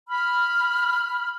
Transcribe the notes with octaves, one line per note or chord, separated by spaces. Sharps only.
B5 F6